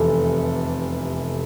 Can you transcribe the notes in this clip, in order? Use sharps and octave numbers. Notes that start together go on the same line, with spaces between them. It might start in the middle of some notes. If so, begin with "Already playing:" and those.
Already playing: F1 E2 C3 A4